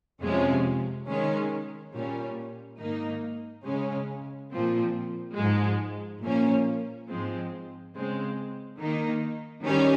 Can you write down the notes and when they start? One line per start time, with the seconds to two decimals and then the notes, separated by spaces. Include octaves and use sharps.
0.22 F2 C3 F3 G#3 C#4
1.08 D#3 G#3 C#4
1.93 A#2 G3 C#4
2.79 G#2 D#3 A#3 D#4
3.64 C#3 G#3 C#4
4.50 A#2 F3 C4
5.36 G#2 F3 G#3
6.21 A#2 F3 A#3 C#4
7.08 G#2 F3 G#3 C4
7.94 C#3 G#3 C4
8.79 D#3 A#3 D#4
9.65 D#3 G3 C#4